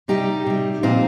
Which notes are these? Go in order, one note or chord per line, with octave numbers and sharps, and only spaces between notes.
C3 G3 D#4 G4
C3 G3
A#2 F3 C4 D#4